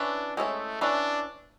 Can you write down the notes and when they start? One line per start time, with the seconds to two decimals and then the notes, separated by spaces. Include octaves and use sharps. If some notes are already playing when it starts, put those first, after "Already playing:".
Already playing: C#4 D4 E4 B4
0.37 G#3 A3 C#4 E4 A4 C#5
0.81 C#4 D4 E4 B4 D5